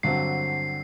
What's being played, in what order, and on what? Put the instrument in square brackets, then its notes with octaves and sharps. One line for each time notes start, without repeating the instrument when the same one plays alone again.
[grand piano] G2 D3 F#3 C4 [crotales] C7